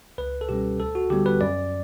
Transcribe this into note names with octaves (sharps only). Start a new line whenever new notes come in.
C#2 B4
A4
B2 G3 C#4 G4
D2 A4
F#4
D3 G3 B3 G4
B4
F#2 D5